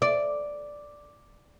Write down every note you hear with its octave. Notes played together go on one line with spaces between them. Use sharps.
D5